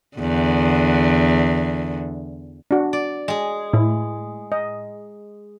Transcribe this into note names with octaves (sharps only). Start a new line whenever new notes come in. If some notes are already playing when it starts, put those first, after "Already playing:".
E2 D3
D4 F#4
D5
G#3 G#4
A2 E4
D#5